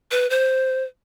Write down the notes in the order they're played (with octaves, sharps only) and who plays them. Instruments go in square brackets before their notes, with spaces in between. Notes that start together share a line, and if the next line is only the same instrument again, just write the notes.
[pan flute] B4
C5